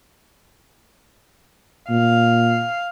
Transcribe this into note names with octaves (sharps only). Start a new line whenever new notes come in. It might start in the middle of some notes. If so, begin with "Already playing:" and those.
A#2 F5